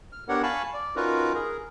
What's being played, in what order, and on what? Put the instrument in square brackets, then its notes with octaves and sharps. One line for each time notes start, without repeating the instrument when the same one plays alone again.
[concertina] F6
B3 D4 G4 A#4 C#5 F#5
F5 G#5 A5 B5 C#6
D5
C#4 D#4 F4 F#4 A#4 B4
G#4 A#4